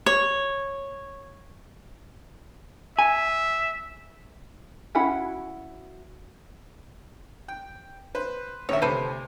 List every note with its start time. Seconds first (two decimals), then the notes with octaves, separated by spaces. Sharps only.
0.06 C#5
2.99 E5 G#5
4.95 C#4 E4 F#4 F#5 B5
7.48 G5
8.15 B4 C5
8.69 A#1 D#3 C#5 E5
8.82 D2 C3 A4 B4 C5